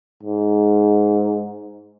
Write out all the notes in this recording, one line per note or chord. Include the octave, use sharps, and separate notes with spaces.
G#2